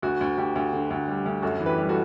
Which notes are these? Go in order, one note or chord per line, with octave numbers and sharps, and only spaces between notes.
D2 F#4
D2
D2 G4
D2
D3
D2
G3
D2
F#2 F#4 A4
E3
G4 B4
G3
F#4 A4